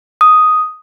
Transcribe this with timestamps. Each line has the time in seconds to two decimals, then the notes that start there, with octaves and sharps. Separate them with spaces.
0.21 D#6